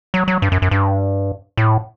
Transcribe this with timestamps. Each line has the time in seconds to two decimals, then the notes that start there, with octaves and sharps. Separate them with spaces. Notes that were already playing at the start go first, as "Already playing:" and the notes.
0.14 F#3
0.28 F#3
0.42 G2
0.52 F#2
0.62 F#2
0.71 G2
1.57 A2